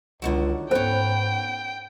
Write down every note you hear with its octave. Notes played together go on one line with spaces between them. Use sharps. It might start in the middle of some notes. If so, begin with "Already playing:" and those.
C#2 D3 D#3 F#3
G#2 B3 C#4 A4 C5 G5